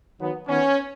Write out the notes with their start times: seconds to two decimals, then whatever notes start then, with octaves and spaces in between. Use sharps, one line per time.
0.18 D#3 F#3 B3
0.47 D#3 B3 C#4